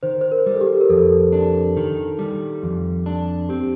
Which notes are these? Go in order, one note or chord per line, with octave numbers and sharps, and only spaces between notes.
D#3 C5
C5
A#4
G3
A4
G4
A#4
F2 A4
D4
D#3
G3
F2
D4
C4 G4